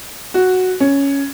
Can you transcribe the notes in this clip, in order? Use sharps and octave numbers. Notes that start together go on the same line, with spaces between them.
F#4
C#4